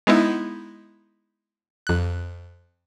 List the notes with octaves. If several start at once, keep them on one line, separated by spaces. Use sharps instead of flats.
G#3 B3 D#4 E4
F2 F#6